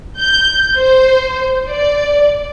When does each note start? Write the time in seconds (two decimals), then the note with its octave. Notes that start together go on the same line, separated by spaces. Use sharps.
0.20 G6
0.78 C5
1.70 D5